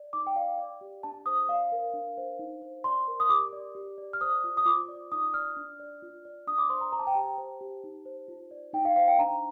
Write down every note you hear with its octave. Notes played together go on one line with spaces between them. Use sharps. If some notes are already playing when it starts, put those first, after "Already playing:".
Already playing: D5
D#4 D6
G5
D5 F5
D5
G4
D4 A5
C5 D#6
D5 F5
A#4
D4
C5
D#4
C5
D5 C6
A#4
D#6
G4 D6
D5
G4
D5
F6
C5 D#6
F4
D#6
F4 D6
D5
D#4 D#6
D5 F6
D4
D5
F4
D5
D4 D#6
D6
C5 C6
A#5
C5 A#5
A5
G5
G4 A5
C5
G4
D#4
C5
F4
D5
D#4 G5
F5
C5 F5
G5
D4 A#5